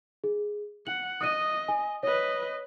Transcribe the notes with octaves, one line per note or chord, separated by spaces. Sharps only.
G#4
F#5 F#7
D#5 D#6 F#6 D#7
G#5
B4 C#5 D#5